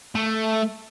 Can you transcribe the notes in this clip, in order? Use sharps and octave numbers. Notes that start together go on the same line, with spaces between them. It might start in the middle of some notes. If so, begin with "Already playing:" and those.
A3